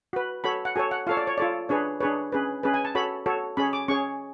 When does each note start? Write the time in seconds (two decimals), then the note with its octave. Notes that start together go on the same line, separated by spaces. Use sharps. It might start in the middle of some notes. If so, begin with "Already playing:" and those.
0.13 F#4 B4
0.44 F#4 A4 C#5 B5
0.65 F#5
0.75 F#4 A4 C#5 G#5
0.91 F#5
1.07 F4 A4 C#5 F5
1.17 D5
1.27 C#5
1.38 F4 A4 C#5 D5
1.69 D4 G#4 B4 C#5
2.01 D4 G#4 B4 C#5
2.32 C#4 G#4 B4
2.63 C#4 G#4 B4
2.74 G#5
2.85 A5
2.95 F#4 A4 C#5 B5
3.26 F#4 A4 C#5
3.57 C#4 G#4 C#5 B5
3.73 D6
3.88 C#4 G#4 C#5 C#6